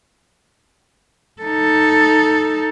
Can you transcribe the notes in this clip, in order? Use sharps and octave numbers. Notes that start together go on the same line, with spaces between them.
D#4 A4